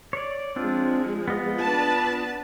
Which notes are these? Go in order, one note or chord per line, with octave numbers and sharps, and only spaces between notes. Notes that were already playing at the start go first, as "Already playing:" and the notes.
C#5 D5
F3 G#3 C4 D4 F4
B3 F4 D#5
D4 B4 A5